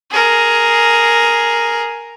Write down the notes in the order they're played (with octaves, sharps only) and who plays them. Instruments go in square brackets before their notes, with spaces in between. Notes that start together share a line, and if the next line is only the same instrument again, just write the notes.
[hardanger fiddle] G#4 A#4